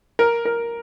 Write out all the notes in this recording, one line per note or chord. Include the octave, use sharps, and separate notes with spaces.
A#4
A#4